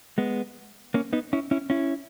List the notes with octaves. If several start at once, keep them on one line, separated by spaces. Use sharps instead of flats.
G#3 B3
A#3 C#4
B3 D#4
C#4 E4
C#4 E4
C#4 E4